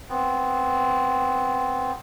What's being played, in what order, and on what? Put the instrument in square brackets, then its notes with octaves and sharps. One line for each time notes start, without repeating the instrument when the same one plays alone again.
[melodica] B3 C4